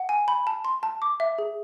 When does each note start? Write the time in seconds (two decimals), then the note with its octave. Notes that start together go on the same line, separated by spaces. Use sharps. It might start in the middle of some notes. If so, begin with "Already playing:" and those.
Already playing: F#5
0.09 G#5
0.28 B5
0.47 A5
0.65 C6
0.83 A5
1.02 D6
1.20 E5
1.38 G#4